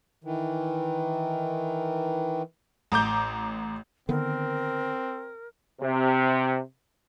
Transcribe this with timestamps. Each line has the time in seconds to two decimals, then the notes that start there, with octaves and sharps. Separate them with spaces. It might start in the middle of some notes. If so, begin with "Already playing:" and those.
0.24 D#3 E3
2.92 A1 A#5 D6 G6
4.09 D3 D#3 B3 C4 A#4
5.81 C3